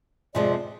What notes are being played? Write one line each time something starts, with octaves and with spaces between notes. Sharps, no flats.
F2 C3 F3 G#3 D5